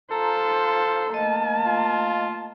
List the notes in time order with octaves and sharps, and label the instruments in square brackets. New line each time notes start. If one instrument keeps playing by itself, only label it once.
[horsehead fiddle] F4 C5 [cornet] A4 [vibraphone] A#5
[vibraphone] A3 D#5 [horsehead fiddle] A#3 A5
[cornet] F4